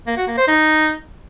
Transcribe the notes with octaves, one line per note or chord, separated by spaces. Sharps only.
A#3
F#4
A#3
C5
D#4